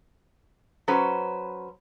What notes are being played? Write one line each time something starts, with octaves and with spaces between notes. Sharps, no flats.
F#3 C#4 B4 C5